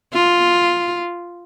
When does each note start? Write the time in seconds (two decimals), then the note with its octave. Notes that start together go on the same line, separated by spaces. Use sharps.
0.13 F4